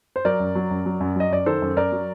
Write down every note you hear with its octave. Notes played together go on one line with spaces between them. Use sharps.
C5
F#3 A#4 D5
F#2
F#3
F#2
F#3
F#2
F#3 D#5
F#2 D5
D#3 A4 C5
F#2
F#2 A#4 D5
F#3